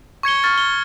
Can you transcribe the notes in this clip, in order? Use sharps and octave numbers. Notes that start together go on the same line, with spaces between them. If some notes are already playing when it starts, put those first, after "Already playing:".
C#6 G#6 C#7 G7
C#6 F6 A6
G7